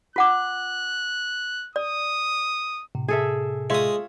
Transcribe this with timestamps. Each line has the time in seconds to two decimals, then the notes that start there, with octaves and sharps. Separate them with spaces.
0.16 F4 F#5 D6 F#6
1.76 D5 D#6
2.95 A2 C3
3.08 G#4 A4 E5
3.70 G#3 F4 C#5 E5 D#6